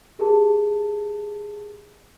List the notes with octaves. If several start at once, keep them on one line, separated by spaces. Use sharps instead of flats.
G4 G#4 A#4 A5